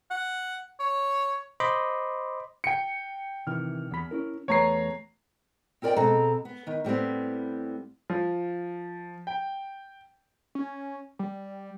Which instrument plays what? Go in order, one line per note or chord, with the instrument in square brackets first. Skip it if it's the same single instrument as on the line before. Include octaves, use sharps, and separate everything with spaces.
[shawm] F#5
C#5
[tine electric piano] C5 D#5 B5 C6 D6
[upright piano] G5 C#7
[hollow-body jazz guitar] C3 D#3 E3 [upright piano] F6
[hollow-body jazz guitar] E2 B5
C#4 E4 A#4
[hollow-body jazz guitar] E2 A3 B4 [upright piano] C#5 A#5 C7
[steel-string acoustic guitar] C4 F4 A#4 D5 D#5 G5
B2 G#3 C4 A4 A#5
B3
D#3 B3
A2 G3 B3 C4
[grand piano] F3
G5
[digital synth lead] C#4
G3